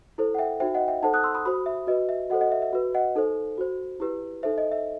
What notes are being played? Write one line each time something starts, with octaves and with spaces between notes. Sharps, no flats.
E4 A4 C5
F#5
E5 G5
D#4 F#4 C5 E5 G5
D#5 F#5
E5 G5
D#4 A4 C5 F#5 A5
D#6 F#6
C6 E6
B5 D#6
F#4 C5 B5 D#6
E5
F#4 B4 D#5
E5
F#4 A4 C5 D#5 F#5
D#5 F#5
E5
E5
F#4 B4
D#5 F#5
D#4 A4 C5
F#4 C5
E4 G4 B4
D#4 A4 C5 E5
D#5
E5